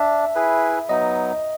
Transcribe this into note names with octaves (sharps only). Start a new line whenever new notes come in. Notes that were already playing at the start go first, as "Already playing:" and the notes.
Already playing: D4 E5
E4 G#4 B4
F#3 B3 D#4 D#5